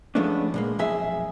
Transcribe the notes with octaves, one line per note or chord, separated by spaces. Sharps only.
F3 G#3 A3 B3 C#4 D4
A#2 G#3 A#3
B1 F2 G#4 E5